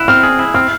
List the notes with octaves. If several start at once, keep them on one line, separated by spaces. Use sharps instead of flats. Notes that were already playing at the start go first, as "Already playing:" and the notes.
Already playing: E4 F#6
C4 F6
G#4
E4
C4 F6